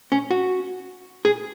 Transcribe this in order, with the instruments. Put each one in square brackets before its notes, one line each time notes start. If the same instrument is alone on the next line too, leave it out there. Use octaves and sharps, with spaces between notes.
[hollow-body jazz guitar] C#4
F#4
G#4